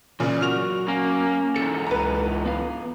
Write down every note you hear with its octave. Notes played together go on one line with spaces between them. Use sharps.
A#2 C#3 E3 B3 D5
F#3 F#4 A#4 F6 F7
A#3 C#4
E2 G#2 A4 C#7
C#2 B4 A#5
B3 F5